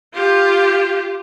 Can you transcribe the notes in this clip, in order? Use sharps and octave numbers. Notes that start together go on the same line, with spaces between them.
F4 G4